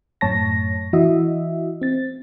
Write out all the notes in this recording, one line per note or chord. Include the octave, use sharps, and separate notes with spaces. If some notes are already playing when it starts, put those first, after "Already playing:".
F#2 A2 C#5 A5 A#6
E3 E4 F#4 D#5 E5
C4 A6